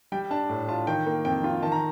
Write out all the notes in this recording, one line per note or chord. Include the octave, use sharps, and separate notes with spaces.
G3 G5
D4 A5
A2
F4 A5
D#3 G5
A#3
F2 G5
F4
D#3 A5
A#5